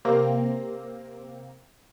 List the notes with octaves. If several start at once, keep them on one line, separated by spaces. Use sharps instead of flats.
C3 A#3 C4 A#6